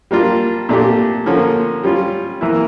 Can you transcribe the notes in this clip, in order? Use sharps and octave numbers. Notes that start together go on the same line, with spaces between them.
G3 A#3 D4 F4
A#2 A3 D4 G4
D3 F3 A#3 C#4
G3 C#4 F4
E3 A#3 E4